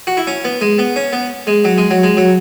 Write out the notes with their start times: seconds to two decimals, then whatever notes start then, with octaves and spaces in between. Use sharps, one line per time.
0.07 F#4
0.17 E4
0.27 C#4
0.45 B3
0.61 G#3
0.79 B3
0.96 C#4
1.13 B3
1.47 G#3
1.65 F#3
1.78 G#3
1.91 F#3
2.03 G#3
2.17 F#3